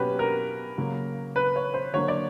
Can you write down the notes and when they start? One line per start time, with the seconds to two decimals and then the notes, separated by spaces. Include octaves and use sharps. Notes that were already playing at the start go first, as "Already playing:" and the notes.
Already playing: B2 F#3 A#3 C#4 F#4 G4 B4
0.19 A#4
0.78 C#3 F#3 A#3
1.36 B4
1.56 C#5
1.74 C5
1.94 D3 F#3 A#3 C#5
2.08 D5